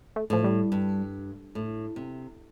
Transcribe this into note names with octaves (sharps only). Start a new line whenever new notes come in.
A3
A2 F3
G3
G2
A2
C3